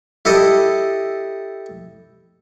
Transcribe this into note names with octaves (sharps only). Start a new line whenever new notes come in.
E4 G4 A4 D#5